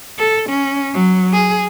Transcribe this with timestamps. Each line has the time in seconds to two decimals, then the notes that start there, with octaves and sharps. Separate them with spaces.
0.19 A4
0.49 C#4
0.94 F#3
1.33 G#4